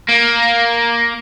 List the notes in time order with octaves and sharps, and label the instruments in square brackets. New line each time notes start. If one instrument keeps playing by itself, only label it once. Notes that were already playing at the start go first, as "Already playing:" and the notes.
[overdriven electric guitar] A#3